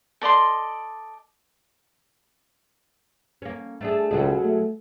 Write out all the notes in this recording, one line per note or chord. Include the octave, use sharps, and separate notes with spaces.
A4 D5 D#5 C6
A#3 C#4
A3 D4 G#4
C#2 B2 F#3 G#4
A3